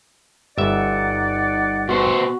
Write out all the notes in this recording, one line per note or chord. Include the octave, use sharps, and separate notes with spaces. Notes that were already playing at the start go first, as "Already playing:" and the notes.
G1 D#4 D5 E5 F#5
B2 F#4 C5